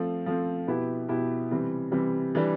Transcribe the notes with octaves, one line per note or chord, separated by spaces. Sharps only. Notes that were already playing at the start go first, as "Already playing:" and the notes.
Already playing: F3 A3 C4
F3 A3 C4
B2 B3 E4 G4
B2 B3 E4 G4
C3 E3 G3 C4
C3 E3 G3 C4
E3 G3 D4